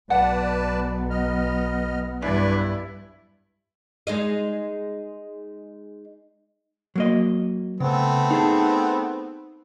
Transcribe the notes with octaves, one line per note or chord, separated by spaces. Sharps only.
B1 B3 B4 D5 F#5 A5
D#5 F6
G2 D4 E4 B4 D5
G#3 D#4 D#5
F#3 A#3 D#5
C#3 A3 B3 C4
D#4 G#4 A5